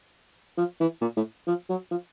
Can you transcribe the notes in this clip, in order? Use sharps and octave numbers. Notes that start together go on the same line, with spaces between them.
F3
E3
A#2
A2
F3
F#3
F3